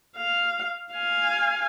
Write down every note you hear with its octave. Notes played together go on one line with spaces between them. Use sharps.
F5
F5 G#5